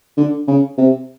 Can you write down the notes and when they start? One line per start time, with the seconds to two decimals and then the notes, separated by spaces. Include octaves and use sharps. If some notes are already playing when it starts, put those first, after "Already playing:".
0.17 D3
0.47 C#3
0.78 C3